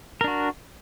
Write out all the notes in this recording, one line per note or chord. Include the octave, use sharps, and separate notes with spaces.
D4 F#4 A#4